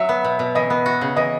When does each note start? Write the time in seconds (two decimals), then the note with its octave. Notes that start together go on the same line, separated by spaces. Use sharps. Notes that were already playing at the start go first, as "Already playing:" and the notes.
Already playing: F#3 E5
0.09 B3
0.24 B2
0.39 B2
0.55 E3 D#5
0.70 B3
0.86 F#4
1.01 C#3
1.16 E3 D#5